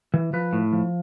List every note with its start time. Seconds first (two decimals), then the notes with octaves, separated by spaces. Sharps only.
0.14 E3
0.33 F3 B4
0.53 A2
0.73 F3